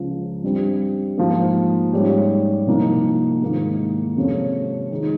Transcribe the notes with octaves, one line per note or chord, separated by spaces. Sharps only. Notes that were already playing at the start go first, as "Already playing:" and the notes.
Already playing: C#2 C#3 F3
G2 G3 C4
G#2 F3 A#3
G#2 G3 C#4 G4
C2 C3 F3 A#3 D#4
G#2 D#3 A#3
F2 C3 F3 G#3 C#4
D#3 G#3 D#4